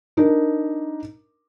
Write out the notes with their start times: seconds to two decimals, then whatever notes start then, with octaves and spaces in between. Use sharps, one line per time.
0.17 D4 D#4 A#4